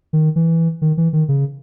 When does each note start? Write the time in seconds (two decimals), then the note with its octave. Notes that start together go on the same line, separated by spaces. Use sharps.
0.13 D#3
0.36 E3
0.82 D#3
0.97 E3
1.13 D#3
1.28 C#3